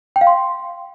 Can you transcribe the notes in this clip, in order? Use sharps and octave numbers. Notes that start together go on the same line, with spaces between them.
G5
F5
C6